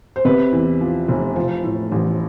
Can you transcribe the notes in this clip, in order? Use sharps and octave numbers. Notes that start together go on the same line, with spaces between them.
C5
C3 B4
E2
F3
F1
F3
A2
A1